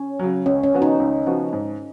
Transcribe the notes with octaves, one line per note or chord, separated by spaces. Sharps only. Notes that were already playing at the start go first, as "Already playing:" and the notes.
Already playing: C#4
C#3 F#3
C#2 C#4
C#4
C#3 F3 B3 F#4
D#4
C#2
C#3 F3 B3 F#4
G#2